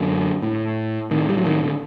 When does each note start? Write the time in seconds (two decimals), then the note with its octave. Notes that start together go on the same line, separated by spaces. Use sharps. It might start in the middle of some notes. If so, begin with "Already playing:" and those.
Already playing: F#2 D3
0.43 A2
1.11 A2 D#3
1.29 G3
1.37 F#3
1.46 D#3
1.63 D3